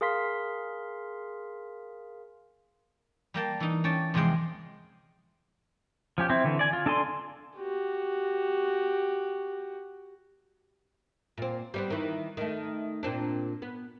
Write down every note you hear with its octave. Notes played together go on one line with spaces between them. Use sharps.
G#4 A#4 F5 C6 B6
G3 A#3 G5 A5
E3 D#4
C#4 D5 G5 A5
E2 C3 F3 G#3 G5 C6
F3 C#4 G4
C4 E4
D3 E3
D5 G#5
F4
D4 A4 D5 G#5 C6
F#4 G4
A#2 C4
G3 B3 C4
D#3 E3
D#3 A3
A#2 C4 D4
B3